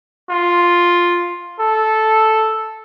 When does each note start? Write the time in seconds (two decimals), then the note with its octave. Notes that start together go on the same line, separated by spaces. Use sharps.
0.30 F4
1.60 A4